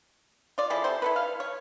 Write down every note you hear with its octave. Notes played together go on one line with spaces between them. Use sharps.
F4 D5
F3 E4 G#4 A4
C3 A4 C5
E4 A4 B4
F5
C#5